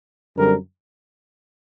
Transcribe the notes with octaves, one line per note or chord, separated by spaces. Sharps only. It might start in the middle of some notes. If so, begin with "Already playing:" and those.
F#2 D3 G3 C4 A#4